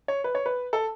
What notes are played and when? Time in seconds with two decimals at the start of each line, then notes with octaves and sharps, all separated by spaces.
0.08 C#5
0.24 B4
0.35 C#5
0.46 B4
0.73 A4